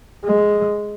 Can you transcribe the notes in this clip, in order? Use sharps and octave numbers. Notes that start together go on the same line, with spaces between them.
G#3